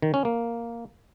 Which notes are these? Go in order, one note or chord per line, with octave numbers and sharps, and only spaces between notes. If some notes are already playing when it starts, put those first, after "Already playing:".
D#3
C#4
A#3